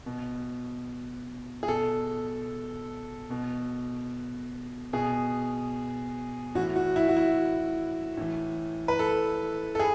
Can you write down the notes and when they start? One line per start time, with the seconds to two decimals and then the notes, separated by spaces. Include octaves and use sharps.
0.06 B2
1.63 G#4
1.68 B2 A4
3.30 B2
4.93 B2 G#4
6.55 A2 E3 F#4
6.76 F#4
6.96 E4
7.08 F#4
7.17 E4
8.17 A2 E3
8.88 B4
8.99 A4
9.75 A4
9.79 G#4